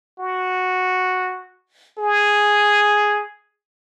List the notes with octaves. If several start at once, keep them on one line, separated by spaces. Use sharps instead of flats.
F#4
G#4